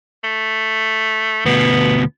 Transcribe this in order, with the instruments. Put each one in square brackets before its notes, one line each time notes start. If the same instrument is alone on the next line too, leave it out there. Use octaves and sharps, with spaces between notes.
[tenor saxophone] A3
[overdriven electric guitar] D2 B2 [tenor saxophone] B3